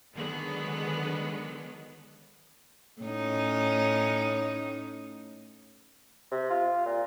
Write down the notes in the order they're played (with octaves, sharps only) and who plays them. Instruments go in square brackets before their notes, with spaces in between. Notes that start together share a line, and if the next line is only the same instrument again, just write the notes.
[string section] D3 D#3 F#3 G#3 B3
[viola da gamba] A2 C#4 D#4
[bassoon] C3
F4
A#2